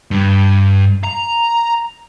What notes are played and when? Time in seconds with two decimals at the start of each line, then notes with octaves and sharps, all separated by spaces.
0.11 G2
1.04 A#5